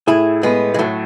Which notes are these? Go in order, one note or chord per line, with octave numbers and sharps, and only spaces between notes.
A2 E4 G#4
A2 G#3 B3
G#3
A2 F#3 A3